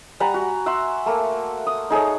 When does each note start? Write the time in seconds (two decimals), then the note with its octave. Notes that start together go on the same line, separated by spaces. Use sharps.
0.20 G3 F#5 G#5 A#5
0.34 F#4
0.66 E5 F#5 C6
1.06 A3 A#3
1.67 D#6
1.90 D#4 G#4 A4 C#5